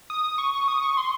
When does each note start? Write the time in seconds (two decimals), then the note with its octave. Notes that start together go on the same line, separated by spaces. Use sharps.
0.10 D#6
0.38 C#6
0.54 C#6
0.68 D#6
0.83 C#6
0.97 C6